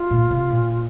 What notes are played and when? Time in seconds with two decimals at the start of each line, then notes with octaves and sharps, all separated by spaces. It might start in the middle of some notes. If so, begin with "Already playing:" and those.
Already playing: F4
0.11 A#2
0.31 C3
0.50 A#2